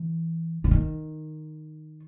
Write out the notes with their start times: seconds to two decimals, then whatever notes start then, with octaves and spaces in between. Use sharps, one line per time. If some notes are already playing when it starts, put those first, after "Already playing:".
Already playing: E3
0.64 D3
0.71 D#3